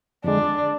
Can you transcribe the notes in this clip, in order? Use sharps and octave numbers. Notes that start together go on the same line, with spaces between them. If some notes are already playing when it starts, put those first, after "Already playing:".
F2 D3 G#3 D4